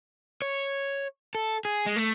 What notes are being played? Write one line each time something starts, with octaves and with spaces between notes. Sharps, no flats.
C#5
A4
G#4
G#3
A3